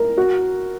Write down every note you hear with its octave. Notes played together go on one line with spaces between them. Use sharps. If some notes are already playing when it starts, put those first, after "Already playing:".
Already playing: A#4
F#4